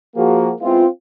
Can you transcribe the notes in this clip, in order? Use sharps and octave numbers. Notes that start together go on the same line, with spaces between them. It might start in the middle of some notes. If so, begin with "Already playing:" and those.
F3 A#3 F#4 G#4
G#3 B3 C4 E4 F4